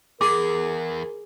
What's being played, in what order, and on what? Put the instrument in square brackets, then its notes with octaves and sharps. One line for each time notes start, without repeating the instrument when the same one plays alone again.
[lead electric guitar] E2 [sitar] G#4 [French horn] A#4 [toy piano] D6